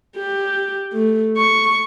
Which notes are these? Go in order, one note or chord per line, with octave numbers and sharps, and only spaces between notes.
G4
A3
C#6